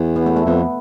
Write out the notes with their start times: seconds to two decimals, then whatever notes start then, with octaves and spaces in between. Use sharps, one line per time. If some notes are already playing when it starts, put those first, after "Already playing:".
Already playing: E2
0.16 B3
0.26 A3
0.36 A3
0.46 F2 B3